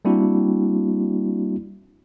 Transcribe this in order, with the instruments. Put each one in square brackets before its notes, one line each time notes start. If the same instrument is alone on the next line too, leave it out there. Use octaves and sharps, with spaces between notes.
[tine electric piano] G3 A#3 C4 D4 E4 F#4